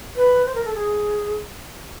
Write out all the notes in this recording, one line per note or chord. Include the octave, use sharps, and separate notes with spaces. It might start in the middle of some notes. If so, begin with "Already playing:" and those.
B4
C5
A#4
A4
G#4